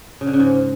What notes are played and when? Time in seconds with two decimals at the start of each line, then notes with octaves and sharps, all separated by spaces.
0.21 C#3
0.27 D3
0.33 C#3
0.40 G#2